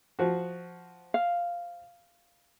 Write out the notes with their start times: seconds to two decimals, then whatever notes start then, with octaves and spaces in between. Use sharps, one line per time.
0.19 F3 F#4
1.14 F5